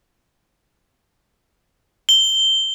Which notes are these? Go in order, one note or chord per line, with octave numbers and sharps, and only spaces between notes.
G7